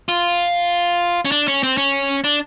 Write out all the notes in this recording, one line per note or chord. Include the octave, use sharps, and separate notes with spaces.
F4
C#4
D4
C#4
C4
C#4
D4